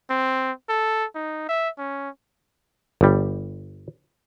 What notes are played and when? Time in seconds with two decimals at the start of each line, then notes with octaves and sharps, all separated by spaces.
0.10 C4
0.69 A4
1.15 D#4
1.49 E5
1.78 C#4
3.01 G1 G3